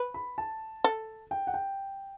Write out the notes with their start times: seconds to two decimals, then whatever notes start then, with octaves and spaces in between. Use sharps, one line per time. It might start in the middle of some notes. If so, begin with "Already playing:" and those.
Already playing: B4
0.14 B5
0.38 A5
0.84 A4
1.31 G5
1.47 F#5
1.54 G5